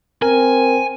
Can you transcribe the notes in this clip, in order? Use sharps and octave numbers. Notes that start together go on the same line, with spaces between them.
C4 A#4 G#5